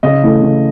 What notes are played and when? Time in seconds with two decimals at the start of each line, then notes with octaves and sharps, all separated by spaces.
0.03 C#3 D#5
0.23 E3 A3
0.42 C#3